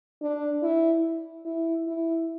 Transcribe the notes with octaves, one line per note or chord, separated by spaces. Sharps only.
D4
E4
E4
E4